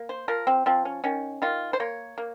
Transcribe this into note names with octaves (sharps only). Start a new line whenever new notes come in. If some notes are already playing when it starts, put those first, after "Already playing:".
Already playing: A#3
C5
F3 A#4
C4
F3 C4
C#4
D#3 C#4
D#3 F4
C5
A#3 C#5
A#3